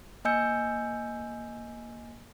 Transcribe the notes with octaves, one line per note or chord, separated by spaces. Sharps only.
A#3 D#5 G#5 E6 G6 C#7